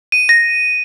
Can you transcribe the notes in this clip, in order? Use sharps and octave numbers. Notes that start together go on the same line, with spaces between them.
D#7
A#6